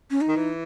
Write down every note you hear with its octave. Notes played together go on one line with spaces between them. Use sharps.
C#4
D#4
D#3
E3